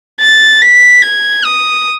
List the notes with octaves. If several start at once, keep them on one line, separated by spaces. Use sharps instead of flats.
A6
B6
G#6
D#6